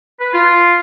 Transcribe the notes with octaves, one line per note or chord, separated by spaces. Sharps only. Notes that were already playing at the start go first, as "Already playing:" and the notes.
B4
F4